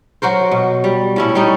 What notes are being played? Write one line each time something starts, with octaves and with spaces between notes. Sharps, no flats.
F#3 F#4 A#4 C5
B2
G3
A2 C#4 E4
G3 C#4 D#4